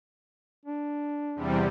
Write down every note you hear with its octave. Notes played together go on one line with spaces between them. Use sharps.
D4
E2 C3 G3